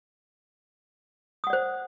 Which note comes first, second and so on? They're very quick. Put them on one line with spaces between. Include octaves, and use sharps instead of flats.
D#6 F#5 D5 C5